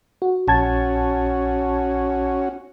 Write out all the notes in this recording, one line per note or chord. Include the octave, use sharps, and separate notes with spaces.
F#4
A#1 C#4 F#4 A5 G#6